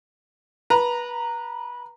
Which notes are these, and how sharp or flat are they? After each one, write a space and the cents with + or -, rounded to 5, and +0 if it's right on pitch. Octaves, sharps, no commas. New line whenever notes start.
B4 -25 A#5 -10